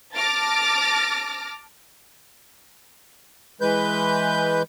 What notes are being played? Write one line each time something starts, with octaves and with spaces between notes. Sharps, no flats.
A5 D6 F6 A6 A#6
E3 G#3 B4 G6